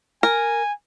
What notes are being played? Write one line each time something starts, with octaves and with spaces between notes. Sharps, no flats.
A#4 G#5